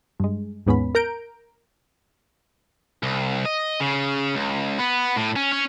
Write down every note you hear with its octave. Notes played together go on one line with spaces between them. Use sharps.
G2 G#3
D#2 G#2 B3 C#4 B5
A#4 A#5 G6 D7
C2
D#5
C#3
C#2
B3
A2
C#4
C#4